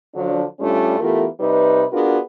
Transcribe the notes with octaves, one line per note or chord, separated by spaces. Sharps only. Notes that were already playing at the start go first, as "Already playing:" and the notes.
D3 F3 F#3 D4
G2 G3 A3 C#4 D4 F4
E3 A3 B3 F4 G4 A#4
C3 G3 D#4 B4
B3 D4 F4 F#4 G#4 A#4